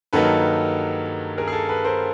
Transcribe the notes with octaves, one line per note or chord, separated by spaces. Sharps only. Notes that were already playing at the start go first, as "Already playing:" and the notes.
G2 D#3 F#3 A#3 D#4 A4 B4
G#4 A#4
G#4
A4
A4 B4
A#4 C5